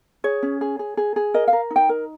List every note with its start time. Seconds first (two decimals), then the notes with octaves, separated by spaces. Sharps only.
0.24 G#4 C#5
0.43 C#4
0.61 G#4
0.79 G#4
0.97 G#4
1.16 G#4
1.34 A#4 D#5
1.48 F5
1.53 A#4
1.71 D#4
1.76 G5
1.89 A#4